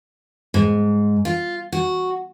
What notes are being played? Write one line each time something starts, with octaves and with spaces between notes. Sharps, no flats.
G#2
F4
F#4